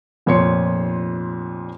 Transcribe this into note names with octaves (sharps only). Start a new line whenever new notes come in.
F1 F2 A#2 C#5 C6 C#7